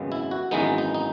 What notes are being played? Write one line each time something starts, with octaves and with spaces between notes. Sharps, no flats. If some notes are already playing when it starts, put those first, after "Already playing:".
Already playing: G#1 F#2 C#3 G#3 B3
E4
F#4
G#1 F#2 E3 G#3 B3 D#4
D#4
D#4